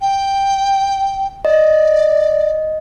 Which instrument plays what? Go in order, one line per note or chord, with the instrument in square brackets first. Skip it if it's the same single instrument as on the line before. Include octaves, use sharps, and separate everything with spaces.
[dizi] G5
[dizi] D5 [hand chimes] D#5